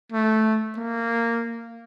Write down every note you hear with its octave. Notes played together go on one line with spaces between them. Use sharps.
A3
A#3